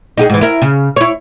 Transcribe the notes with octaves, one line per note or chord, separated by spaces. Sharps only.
D#4 G4 G#4
G#2 E3
E4 A#4
C#3
E4 C#5